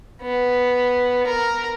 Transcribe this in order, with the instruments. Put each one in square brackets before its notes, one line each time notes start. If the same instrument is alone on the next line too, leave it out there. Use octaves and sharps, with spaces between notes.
[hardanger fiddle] B3
A#4